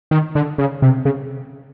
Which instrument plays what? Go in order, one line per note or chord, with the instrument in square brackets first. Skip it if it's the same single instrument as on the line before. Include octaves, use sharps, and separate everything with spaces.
[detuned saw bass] D#3
D3
C#3
C3
C#3